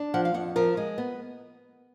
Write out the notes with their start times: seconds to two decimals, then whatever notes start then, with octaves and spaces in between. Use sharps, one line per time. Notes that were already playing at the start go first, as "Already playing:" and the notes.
Already playing: D4
0.14 F3 F#5
0.25 F5
0.34 F2 F#5
0.56 F3 A#4
0.77 G#3
0.98 B3